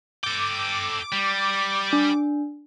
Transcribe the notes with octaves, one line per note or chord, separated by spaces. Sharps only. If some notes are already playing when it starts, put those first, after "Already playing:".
A4 G5 D6
G3
D4